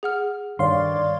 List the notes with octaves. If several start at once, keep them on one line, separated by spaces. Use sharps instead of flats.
G#4 F#5 F6
G2 D#3 C#5 D5 F5 C6